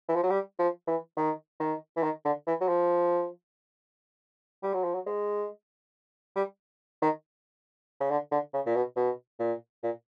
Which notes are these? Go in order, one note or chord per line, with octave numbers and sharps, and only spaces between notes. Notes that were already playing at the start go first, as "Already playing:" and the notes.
E3
F3
F#3
G3
F3
E3
D#3
D#3
E3
D#3
D3
E3
F#3
F3
G3
F#3
F3
F#3
G#3
G3
D#3
C#3
D3
D3
C#3
A#2
B2
B2
A#2
A#2